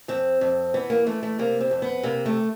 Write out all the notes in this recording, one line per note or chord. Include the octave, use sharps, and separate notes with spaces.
F2 C4
F2
E3 B3
A#3
E3 A3
A3
C3 A#3
C4
F2
B3
C3 A#3
A3